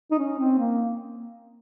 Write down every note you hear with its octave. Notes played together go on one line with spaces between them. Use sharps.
D#4
C#4
C4
A#3